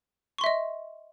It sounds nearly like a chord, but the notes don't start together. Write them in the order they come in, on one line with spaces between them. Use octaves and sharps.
C#6 C6 E5 D#5